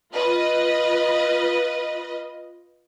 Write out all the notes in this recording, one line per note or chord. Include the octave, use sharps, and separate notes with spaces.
F4 B4 D#5